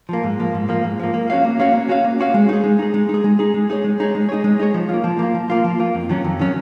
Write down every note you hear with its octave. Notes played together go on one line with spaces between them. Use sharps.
F3 A#3
G#2
F3 A#3
G#2
F3 A#3
G#2
F3 A#3
A#3
C#4 F#4 C#5 F5
A#3
C#4 F#4 C#5 F5
A#3
C#4 F#4 C#5 F5
A#3
C#4 F#4 C#5 F5
G#3
D#4 G#4
G#3
D#4 G#4
G#3
D#4 G#4
G#3
D#4 G#4
G#3
D#4 G#4 C#5
G#3
D#4 G#4 C#5
G#3
D#4 G#4 C#5
G#3
D#4 G#4 C#5
F3
A#3 F4
F3
A#3 F4
F3
A#3 F4
F3
A#3 F4
F2
D#3 F#3 C#4
F2
D#3 F#3 C#4